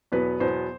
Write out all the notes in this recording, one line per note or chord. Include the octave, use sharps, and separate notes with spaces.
E2 B2 F#3 B3 B4
E2 B2 F#3 B3 C5